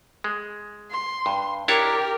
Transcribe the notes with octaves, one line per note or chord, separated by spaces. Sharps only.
G#3
C6
G2
D4 E4 G4 A#4 C#5